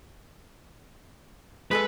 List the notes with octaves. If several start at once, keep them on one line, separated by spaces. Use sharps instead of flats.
G#3 G#4 A4 B4